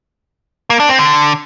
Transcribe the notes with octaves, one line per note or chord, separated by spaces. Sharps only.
A#3
D4
C4
D3